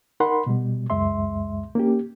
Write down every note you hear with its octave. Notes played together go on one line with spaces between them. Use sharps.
D#4 A#4 F#5 B5 C6
B2 G3
C#2 F#2 G#3 E5 C6
A#3 C#4 G4